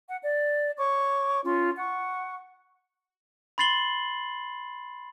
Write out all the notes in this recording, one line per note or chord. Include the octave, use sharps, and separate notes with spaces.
F#5
D5
C#5 C#6 D6
C#4 F4 C6
F#5 C#6
B5 C6 A6 C7 F#7 G7